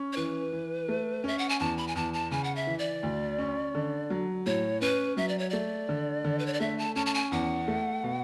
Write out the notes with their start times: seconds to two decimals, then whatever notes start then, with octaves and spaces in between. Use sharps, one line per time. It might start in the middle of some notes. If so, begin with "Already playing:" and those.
Already playing: C#4
0.13 C#5
0.17 E3 B4
0.52 E3
0.88 A3
1.24 C#4 E5
1.38 F#5
1.49 G#5
1.60 E2 A5
1.78 B5
1.88 G#5
1.95 E2 A5
2.14 A5
2.31 C#3 G#5
2.44 F#5
2.56 E5
2.67 E3
2.79 D5
3.03 D2
3.39 C#4
3.75 D3
4.10 F#3
4.46 A2 C#5
4.81 C#4 B4
5.17 F#3 E5
5.29 D5
5.39 C#5
5.50 A3 D5
5.89 D3
6.24 D3
6.39 B4
6.46 C#5
6.53 D5
6.60 A3 E5
6.78 A5
6.96 C#4 A5
7.06 A5
7.14 G#5
7.32 E2 F#5
7.68 A3
8.04 B2